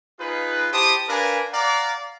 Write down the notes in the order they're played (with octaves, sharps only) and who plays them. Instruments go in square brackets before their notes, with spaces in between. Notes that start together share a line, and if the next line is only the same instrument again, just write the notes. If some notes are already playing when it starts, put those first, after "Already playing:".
[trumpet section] D#4 F4 G#4 B4
E4 G4 C5 A5 D#6
D4 A#4 B4 F5 G#5
D5 F5 F#5 A#5